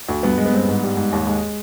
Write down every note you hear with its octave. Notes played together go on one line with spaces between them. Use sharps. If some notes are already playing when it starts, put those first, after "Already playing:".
D2
G2 B3
G#3
B3
G2 C4
B3
G#2
G3
G#2
D#2
G#3